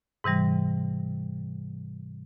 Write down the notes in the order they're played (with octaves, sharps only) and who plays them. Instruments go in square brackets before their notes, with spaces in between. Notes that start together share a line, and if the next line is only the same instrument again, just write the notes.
[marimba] G#2 C3 E3 G3